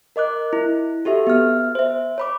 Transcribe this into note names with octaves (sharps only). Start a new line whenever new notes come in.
A#4 D#5 D6 F#6
E4
F#4 G4 A4 E5
B3 E5 F6
C5 E5
C#5 B5 D6